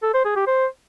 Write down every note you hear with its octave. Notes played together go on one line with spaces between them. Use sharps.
A4
C5
G#4
G4
C5